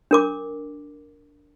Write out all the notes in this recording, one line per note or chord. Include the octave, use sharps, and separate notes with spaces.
D4 A#4 D6